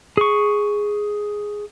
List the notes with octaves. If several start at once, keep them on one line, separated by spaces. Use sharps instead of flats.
G#4 C#6